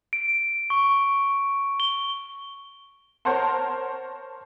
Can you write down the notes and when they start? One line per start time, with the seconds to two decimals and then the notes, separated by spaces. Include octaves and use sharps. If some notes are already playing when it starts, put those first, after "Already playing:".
0.13 D7
0.70 C#6
1.80 G7
3.25 A#4 C5 C#5 F#5 A5 C6